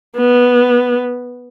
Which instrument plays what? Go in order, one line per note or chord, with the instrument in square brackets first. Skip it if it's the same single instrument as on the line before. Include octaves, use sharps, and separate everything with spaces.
[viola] B3